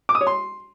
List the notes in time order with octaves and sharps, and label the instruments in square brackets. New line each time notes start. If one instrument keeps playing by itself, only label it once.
[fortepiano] D6
D#6
C#5
C6